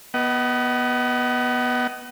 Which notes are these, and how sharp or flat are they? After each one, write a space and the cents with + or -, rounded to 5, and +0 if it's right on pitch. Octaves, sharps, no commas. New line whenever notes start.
B3 -15 D#5 +0 F#5 +35